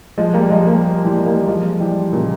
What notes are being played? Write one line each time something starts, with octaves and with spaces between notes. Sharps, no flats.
F3 G#3
G3 A#3
F3 G#3
G3 A#3
E3 G3
G3 A#3
F3 G#3
E3 G3
A#2 C#3